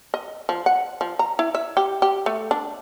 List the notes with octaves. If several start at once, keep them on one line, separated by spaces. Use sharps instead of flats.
D#5
F3
F#5
F3
A#5
E4
E5
G4
G4
A3
D4